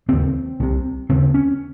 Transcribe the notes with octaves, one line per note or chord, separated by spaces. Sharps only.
D#2 C#3 C4
C2 C3
D#2 C#3 C4
C#4